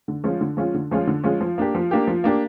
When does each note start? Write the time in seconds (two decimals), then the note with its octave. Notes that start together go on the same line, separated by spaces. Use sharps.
0.08 D3
0.24 F3 G#3 C#4 F4
0.41 D3
0.57 F3 G#3 C#4 F4
0.74 D3
0.91 F3 G#3 C#4 F4
1.07 D3
1.24 F3 G#3 C#4 F4
1.41 F3
1.58 A#3 D4 G4
1.75 F3
1.91 A#3 D4 G4
2.07 F3
2.24 A#3 D4 G4